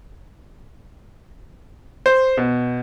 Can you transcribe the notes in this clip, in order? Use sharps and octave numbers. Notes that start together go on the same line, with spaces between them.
C5
B2